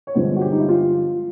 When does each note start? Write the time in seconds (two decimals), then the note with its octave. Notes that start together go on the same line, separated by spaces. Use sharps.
0.07 C#5
0.14 G2 D3 F3 G#3 B3 C5
0.36 F#4
0.41 G4
0.52 D#4
0.60 E4
0.69 F4